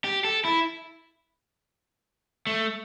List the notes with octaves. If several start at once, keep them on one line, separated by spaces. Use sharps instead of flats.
G4
A4
E4
A3